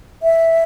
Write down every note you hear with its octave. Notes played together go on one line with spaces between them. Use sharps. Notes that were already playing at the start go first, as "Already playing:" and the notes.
E5